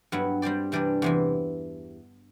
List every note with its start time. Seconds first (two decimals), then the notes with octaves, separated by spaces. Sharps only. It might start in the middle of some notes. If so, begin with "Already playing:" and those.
0.12 G2 F#3 B3 E4
0.42 G3 C4 G4 D5
0.72 C3 E3 G3 D4 G4
1.02 E2 C3 E3